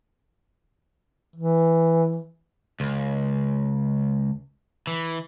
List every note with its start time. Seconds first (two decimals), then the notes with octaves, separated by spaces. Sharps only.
1.36 E3
2.80 C#2
4.87 E3